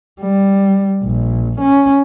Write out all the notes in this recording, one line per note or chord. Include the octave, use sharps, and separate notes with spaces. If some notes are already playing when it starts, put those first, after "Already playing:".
G3
A#1
C#4